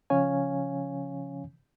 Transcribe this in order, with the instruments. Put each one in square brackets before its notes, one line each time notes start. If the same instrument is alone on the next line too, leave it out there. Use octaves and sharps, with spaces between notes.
[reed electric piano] C#3 F3 C#4 C#5 F5 G#5